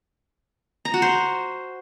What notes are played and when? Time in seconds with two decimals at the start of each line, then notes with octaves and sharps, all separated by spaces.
0.85 A#5
0.94 F#4
1.02 C5